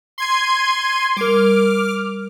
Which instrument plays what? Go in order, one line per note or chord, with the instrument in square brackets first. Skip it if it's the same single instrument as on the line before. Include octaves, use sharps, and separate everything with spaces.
[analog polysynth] C6 G#6 D#7
[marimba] G3 A#4 [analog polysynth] D6 F6